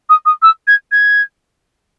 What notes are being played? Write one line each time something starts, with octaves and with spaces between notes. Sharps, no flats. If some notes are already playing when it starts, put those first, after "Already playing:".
D#6
D#6
E6
G#6
G#6